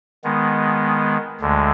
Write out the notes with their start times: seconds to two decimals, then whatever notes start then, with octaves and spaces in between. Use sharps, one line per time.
0.24 D#3 G#3 B3
1.40 D2 D3 G#3